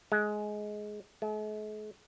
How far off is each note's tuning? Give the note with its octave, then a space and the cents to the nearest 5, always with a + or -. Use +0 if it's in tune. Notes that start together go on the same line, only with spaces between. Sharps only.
G#3 +15
G#3 +45